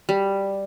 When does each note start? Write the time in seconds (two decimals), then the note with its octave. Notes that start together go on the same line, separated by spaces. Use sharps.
0.09 G3